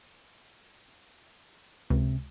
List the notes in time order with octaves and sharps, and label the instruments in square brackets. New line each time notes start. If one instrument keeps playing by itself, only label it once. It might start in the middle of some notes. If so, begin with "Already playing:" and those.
[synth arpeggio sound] C#2 [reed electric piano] C3